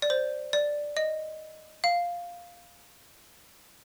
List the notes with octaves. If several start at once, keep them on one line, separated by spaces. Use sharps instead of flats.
D5
C5
D5
D#5
F5